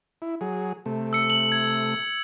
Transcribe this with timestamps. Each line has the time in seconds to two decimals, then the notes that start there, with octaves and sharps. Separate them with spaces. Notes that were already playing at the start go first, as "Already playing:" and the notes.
0.22 E4
0.41 F#3 G#4
0.86 C3 A3
1.13 E6 C#7
1.30 F#7
1.52 G#6